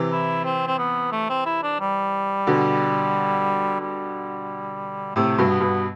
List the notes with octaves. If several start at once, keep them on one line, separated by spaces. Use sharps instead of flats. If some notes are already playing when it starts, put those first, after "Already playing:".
Already playing: C3 E3
E4
C4
C4
B3
A3
C4
E4
D4
G3
B2 D3
G3
A2 C3 A3
G2 B2
B3
G2 B2